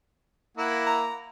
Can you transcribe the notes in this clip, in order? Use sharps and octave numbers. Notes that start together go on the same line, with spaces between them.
A#3 E4 F#5
A#5